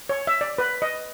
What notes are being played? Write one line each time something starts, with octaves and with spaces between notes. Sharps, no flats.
C#5
E5
D5
B4
D#5